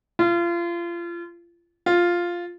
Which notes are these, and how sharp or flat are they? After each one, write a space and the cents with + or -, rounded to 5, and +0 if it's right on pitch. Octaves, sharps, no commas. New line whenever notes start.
F4 -30
F4 +0